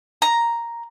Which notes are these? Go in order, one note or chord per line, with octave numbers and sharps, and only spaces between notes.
A#5